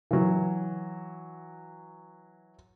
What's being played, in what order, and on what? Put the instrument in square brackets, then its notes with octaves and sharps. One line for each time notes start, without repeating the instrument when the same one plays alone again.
[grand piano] E3 F#3